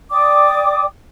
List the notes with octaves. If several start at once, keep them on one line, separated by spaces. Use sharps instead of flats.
D5 G5 D6 D#6